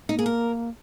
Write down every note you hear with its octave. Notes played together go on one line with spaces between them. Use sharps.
A#3 D#4
G#4
A#4